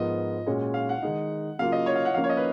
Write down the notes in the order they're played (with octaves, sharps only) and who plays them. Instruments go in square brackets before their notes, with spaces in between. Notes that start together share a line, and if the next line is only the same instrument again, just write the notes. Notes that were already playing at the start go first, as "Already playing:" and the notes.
Already playing: [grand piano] G#2 F3 B3 F4 A#4 [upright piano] D#5
[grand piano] A#2 G#3 C#4 F#4 C#5
[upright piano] F5
F#5
[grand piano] D#3 G#3 D#4
[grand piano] C#3 F#3 A#3 F4 [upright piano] F5
[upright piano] D#5
C#5
F5
F#5
[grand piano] F3 A#3 C#4 [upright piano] F5
[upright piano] C#5
D#5
B4